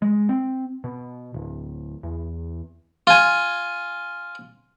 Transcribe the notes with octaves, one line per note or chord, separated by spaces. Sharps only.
G#3
C4
B2
D1
E2
F4 G#5